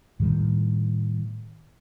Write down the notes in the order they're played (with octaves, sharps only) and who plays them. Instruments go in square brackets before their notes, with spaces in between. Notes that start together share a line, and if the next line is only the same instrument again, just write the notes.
[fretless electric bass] A2 D#3 G3